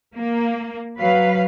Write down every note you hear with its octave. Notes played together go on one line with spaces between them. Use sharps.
A#3
F#3 B4 F5